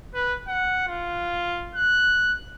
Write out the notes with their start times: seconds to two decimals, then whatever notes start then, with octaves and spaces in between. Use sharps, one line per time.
0.14 B4
0.48 F#5
0.88 F4
1.75 F#6